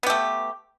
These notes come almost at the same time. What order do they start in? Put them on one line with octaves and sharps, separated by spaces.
B3 G4 A3